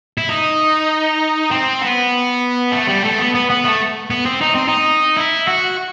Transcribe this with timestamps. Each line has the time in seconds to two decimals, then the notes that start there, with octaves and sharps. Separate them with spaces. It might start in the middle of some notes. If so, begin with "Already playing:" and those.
0.18 E4
0.29 D#4
1.51 C4
1.82 B3
2.73 A3
2.89 G3
3.04 A3
3.19 B3
3.35 B3
3.50 B3
3.65 A3
4.10 B3
4.26 C4
4.41 D#4
4.55 C4
4.68 D#4
5.17 E4
5.48 F#4